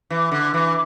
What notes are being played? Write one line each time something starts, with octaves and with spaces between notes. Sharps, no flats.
E3
D3
E3